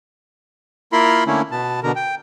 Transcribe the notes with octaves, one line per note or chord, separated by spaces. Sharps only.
A#3 E4 F4 A#4 B5 C6
D3 A3 A#3 C#4 E4
B2 B3 A5
B2 D3 A#4
G5